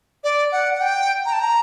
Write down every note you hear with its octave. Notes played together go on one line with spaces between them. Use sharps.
D5
F#5
F#5
G5
A#5
A5
A#5